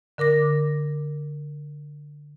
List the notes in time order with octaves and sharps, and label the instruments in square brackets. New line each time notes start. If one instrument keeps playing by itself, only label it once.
[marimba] D3 A#4 D6 A#6